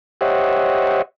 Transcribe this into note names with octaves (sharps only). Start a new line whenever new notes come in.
G4 C5 C#5 D#5 E5 F#5